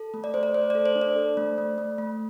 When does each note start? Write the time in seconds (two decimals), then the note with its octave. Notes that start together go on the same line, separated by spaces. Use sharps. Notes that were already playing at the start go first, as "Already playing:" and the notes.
Already playing: A4
0.14 A3
0.24 D5
0.34 A3 C5
0.43 D5
0.54 A3 C5
0.70 A4 D5
0.86 C5
0.95 D4
1.01 D5
1.16 A4
1.37 A3
1.58 A3
1.78 A3
1.98 A3